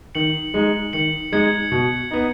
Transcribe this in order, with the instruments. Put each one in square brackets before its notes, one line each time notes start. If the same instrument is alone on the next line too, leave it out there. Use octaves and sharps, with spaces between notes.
[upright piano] D#3 [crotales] C#7 F#7
[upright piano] G#3 D#4
[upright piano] D#3 [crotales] C#7 F#7
[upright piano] G#3 D#4 [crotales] G#6 C#7
[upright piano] B2
B3 D#4